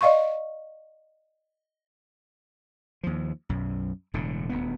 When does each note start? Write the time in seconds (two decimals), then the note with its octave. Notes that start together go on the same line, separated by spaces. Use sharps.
0.01 D5 D#5 F5 C6 C#6
3.03 D#2 F3
3.49 B1 F#2
4.14 E1 A2 D3
4.49 D#1 D2 B3